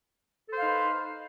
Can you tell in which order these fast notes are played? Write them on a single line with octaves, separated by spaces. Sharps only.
A4 C5 F5 D#4 B4